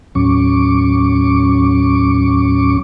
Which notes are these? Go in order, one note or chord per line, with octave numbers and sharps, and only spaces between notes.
D#2 A2 F#3 C#4 C#6 D6